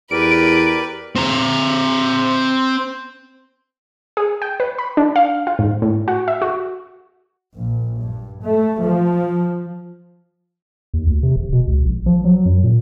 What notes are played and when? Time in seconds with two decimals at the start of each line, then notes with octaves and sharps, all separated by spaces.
0.11 E2 G4 A#4 B4 D5 D7
1.16 C4 A#5
4.17 G#4
4.42 G5
4.60 B4
4.79 B5
4.97 D4
5.16 F5
5.47 F4
5.59 G#2
5.82 A2
6.08 F#4
6.28 E5
6.42 F#4
7.55 A#1
7.99 G2
8.42 A3
8.81 F3
10.94 D#2
11.07 D2
11.23 C3
11.36 D1
11.53 B2
11.67 C#2
11.86 A#1
12.06 F3
12.25 F#3
12.46 F#2
12.63 A#2